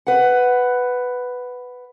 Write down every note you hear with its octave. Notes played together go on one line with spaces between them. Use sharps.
B4 F#5